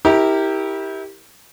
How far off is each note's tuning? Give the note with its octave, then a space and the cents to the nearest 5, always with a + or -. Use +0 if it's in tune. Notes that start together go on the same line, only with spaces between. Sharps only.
E4 -30 G4 +0 A#4 -15